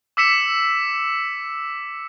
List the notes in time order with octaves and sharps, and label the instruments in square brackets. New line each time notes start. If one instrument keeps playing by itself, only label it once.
[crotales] D6 E6 B6 C#7 E7